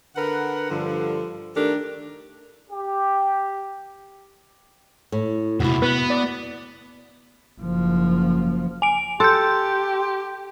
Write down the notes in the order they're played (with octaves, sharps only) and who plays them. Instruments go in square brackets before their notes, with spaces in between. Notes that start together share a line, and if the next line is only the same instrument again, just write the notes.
[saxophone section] D3 A#4 B4 F#5
G2 D3 F3
D#3 A3 D4 G4 A4 A#4
[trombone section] G4
[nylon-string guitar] A2
[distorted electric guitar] E2 C3 [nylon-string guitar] E4 F#4
[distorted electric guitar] B3 [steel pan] B4
[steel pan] D5
[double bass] F#1 F3
[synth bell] G#5 D7
[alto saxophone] G4 [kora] A4 [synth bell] C6 G6